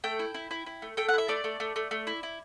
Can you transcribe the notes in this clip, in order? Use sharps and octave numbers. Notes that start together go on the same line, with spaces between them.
A3 G5
E4
E4
E4
E4
A3
A3 G5
F#5
E4 E5
A3 D5
A3
A3
A3
A3
E4
E4